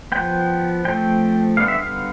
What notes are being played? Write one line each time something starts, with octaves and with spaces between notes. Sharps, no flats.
F3 B3 G5
F3 A3 C4 G5
D3 G3 B3 F5
E5
F5